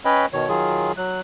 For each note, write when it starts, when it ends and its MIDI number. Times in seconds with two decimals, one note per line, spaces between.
0.05 0.26 61
0.05 0.26 71
0.05 0.26 73
0.05 0.26 75
0.05 0.26 79
0.05 0.26 83
0.33 0.49 47
0.33 0.49 51
0.33 0.49 73
0.49 0.92 51
0.49 0.92 54
0.49 0.92 65
0.49 0.92 68
0.97 1.21 54
0.97 1.21 90